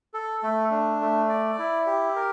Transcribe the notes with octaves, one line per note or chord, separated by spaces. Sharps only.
A4
A3
D4
A3
D5
E4
G4
A#4